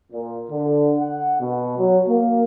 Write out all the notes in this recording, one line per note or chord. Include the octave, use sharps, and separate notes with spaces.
A#2
D3
F#5
B2
F#3
A#3